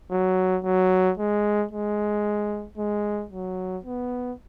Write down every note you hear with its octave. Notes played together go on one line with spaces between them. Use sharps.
F#3
F#3
G#3
G#3
G#3
F#3
B3